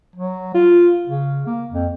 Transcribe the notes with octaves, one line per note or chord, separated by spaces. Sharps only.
F#3
F4
C#3
A#3
F2